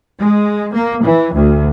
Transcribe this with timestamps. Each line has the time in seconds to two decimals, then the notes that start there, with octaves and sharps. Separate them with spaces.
0.20 G#3
0.74 A#3
1.03 E3
1.34 D2